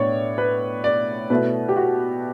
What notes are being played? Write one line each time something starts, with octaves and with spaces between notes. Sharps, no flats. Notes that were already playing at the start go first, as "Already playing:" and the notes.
Already playing: A2 B3 D4 C#5 D5
B4
D5
B2 A3 E4 B4
G4
F#4